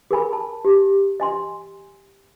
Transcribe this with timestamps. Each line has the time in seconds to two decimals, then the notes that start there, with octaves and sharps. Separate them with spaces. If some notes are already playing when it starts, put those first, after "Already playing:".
0.11 G#4 A#4 G#5 B5
0.33 A5
0.65 G4
1.20 D#5 G#5 C6